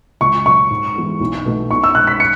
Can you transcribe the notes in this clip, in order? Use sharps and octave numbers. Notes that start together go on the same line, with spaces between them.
C#2 C#6
B2 F#3 C#6
G#2
E3 G#3 B3 E4
B1
B2 A3 D#4
B1 C#6
E6
B2 G#3 F#6
B6
C#7